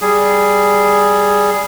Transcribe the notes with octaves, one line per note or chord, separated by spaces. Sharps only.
G3 G#4